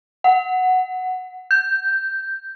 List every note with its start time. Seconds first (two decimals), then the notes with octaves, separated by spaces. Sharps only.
0.24 F#5
1.51 G6